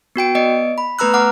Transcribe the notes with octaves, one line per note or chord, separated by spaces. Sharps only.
B3 F#4 G5 D7
B3 D5 D#5 C#7 D7
B5
A3 B3 B4 A#5 E6 F#6
F#5 A#5 D6 F6